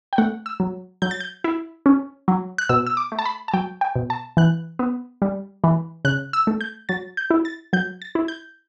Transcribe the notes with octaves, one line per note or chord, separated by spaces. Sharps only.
G5
A3 F#5
E6
F#3
F#3 G6
A6
G6
E4
C#4
F#3
F#6
B2 E6
E6
D6
A3
A5
B5
A5
F#3 G5
G5
B2
A5
E3 F#6
B3
G3
E3
C#3 F#6
E6
A3
G6
F#3 A6
G6
E4
A6
F#3 G6
A6
E4
G6